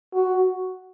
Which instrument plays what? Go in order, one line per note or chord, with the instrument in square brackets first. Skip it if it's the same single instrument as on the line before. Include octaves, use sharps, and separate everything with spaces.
[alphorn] F#4